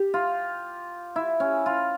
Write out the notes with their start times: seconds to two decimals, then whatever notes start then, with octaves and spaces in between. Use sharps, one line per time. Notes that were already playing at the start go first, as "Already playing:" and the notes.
Already playing: G4
0.14 F4
1.16 E4
1.40 C#4
1.66 F4